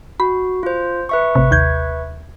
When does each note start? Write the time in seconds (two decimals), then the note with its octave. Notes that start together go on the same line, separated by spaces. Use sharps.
0.20 F#4 B5
0.63 F4 C5
1.09 B4 E5 C#6
1.35 A1 C3
1.51 D#2 G6 G#6